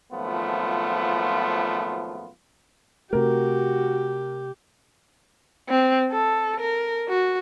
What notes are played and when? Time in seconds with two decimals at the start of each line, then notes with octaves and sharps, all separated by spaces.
0.12 G#1 F#2 F3 A3 B3 F4
3.13 C3 A3 F#4 G4 A#4
5.69 C4
6.12 A4
6.61 A#4
7.09 F#4